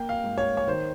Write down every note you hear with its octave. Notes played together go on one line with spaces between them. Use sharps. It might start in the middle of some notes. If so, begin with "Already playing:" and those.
Already playing: A#3 G5
F5
G#2
C#5
C#5
D#3 C5